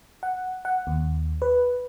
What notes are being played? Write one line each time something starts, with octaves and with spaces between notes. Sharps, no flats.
F#5
F#5
D#2
B4